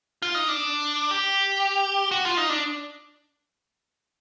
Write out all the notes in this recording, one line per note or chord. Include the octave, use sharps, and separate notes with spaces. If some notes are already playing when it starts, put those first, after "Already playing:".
F4
D#4
D4
G4
F#4
F4
D#4
D4